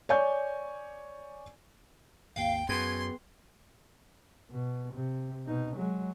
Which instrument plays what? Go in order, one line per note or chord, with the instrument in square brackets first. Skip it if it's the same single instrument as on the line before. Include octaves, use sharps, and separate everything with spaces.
[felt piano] C#5 D5 G#5 C#6 G6
[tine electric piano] G#1 D#2 [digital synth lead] F5 [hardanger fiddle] G5
[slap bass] F#2 [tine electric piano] B3 G#4 B4 [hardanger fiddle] C6 [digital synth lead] G#6
[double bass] B2
C3
B2 D#4
F#3 G#3